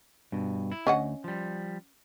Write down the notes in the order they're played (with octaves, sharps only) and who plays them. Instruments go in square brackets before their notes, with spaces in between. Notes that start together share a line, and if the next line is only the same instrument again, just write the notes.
[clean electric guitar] G2 B2
E4
[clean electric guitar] D2 [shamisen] C#4 D#5 F#5
[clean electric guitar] F3 G3